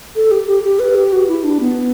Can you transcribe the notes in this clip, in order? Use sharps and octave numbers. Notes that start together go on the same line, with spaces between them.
A4
G4
G4
G4
B4
G4
F#4
E4
D4
B3